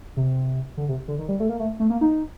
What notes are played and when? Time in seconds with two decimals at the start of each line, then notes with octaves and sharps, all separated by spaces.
0.17 C3
0.77 D3
0.89 C3
1.08 D3
1.19 D#3
1.28 G3
1.40 A3
1.49 A#3
1.59 A3
1.80 A3
1.90 A#3
2.01 D#4